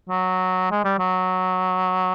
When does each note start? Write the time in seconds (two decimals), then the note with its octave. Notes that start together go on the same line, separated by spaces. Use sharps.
0.09 F#3
0.71 G#3
0.84 G3
0.98 F#3